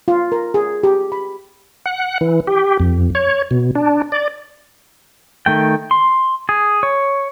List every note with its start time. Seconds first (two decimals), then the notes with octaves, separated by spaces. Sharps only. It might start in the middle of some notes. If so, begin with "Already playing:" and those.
0.08 F4
0.32 A#4
0.54 G#4
0.83 G4
1.12 B5
1.86 F#5
2.21 E3
2.47 G4
2.80 F2
3.15 C#5
3.51 B2
3.75 D4
4.12 D5
5.46 D#3 A3 G5
5.91 C6
6.49 G#4
6.83 C#5